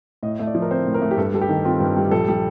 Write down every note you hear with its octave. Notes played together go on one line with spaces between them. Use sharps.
A2 D#5
A3
D5
F3
A#4
C4 C5
A2
A#4
A3
G4
G2 A4
G3 A4
G4
D#3
C4 F4
G2
G3
A#1 A4
G3